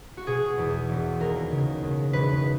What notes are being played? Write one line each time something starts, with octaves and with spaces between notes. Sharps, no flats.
F#4
B2 G#4
E2
E1
D#2 A#4
C#3
D#2
E1 B4